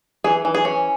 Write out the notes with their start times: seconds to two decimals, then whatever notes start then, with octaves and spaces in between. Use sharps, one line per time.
0.24 E3 G#4
0.45 E3
0.55 G#4
0.65 C#4